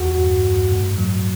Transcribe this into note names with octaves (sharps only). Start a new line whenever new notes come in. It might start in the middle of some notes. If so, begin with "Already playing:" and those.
Already playing: E2 F#4
G2
G2
A2
F#3